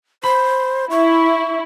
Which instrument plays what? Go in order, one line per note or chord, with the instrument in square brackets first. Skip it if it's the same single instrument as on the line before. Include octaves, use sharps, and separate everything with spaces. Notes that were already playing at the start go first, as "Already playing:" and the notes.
[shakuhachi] C5 [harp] B5
[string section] E4 [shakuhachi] C#6